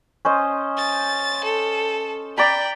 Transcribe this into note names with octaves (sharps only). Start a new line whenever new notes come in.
C#4 C5 D#5
A6
A4
D5 G5 A#5 B5